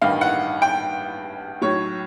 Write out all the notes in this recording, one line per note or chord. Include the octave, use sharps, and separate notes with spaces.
A1 G2 D#3 F5
F#5
G5
B1 A2 F#3 C#5